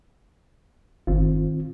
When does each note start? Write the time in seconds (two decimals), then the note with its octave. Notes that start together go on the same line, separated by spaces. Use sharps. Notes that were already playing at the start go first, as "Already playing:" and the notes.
1.07 G1 D#3 C4 F4